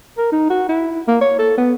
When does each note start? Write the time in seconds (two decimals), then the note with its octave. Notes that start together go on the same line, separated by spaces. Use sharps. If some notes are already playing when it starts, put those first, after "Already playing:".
0.18 A#4
0.32 D#4
0.50 F#4
0.69 E4
1.08 A#3
1.21 C#5
1.39 A4
1.58 B3